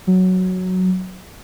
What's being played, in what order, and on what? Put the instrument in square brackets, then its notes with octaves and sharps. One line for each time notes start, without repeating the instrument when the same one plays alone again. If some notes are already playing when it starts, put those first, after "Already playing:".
[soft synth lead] F#3